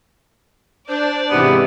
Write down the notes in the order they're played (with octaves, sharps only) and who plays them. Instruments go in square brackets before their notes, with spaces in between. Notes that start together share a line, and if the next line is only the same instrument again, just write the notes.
[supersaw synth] D4 [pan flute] C5 [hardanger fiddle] D5
[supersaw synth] G#2 C3 E3 [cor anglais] B3 [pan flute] G4